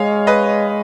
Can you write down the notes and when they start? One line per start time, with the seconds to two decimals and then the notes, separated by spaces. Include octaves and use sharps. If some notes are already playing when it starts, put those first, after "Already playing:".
Already playing: G#3 C#5 D#5 F5
0.27 B4 D#5